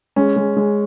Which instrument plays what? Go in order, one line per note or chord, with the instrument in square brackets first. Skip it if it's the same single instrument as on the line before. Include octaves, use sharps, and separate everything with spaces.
[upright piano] G#3 [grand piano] C#4
[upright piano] G#3
G#3